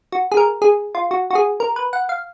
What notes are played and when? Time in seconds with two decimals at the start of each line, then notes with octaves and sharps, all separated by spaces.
0.12 F#4
0.32 G#4
0.37 A#4
0.62 G#4
0.95 F4
1.11 F#4
1.31 F#4
1.35 G#4
1.60 A#4
1.76 B4
1.93 F#5
2.09 F5